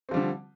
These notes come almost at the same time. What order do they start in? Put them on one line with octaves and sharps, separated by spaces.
C4 F3 G3 D3